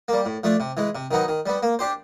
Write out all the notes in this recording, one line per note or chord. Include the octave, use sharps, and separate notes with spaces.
G3 A#3
A2
F3 A3 D4
C3
E3 G#3
C3
D#3 F#3 B3 D#4
D#3
G3 B3
A#3
D4 G4 C5